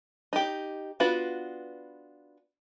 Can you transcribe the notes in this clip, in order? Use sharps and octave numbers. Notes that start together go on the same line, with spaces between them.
D#4 G4
B3 D4 F4 F#4 B4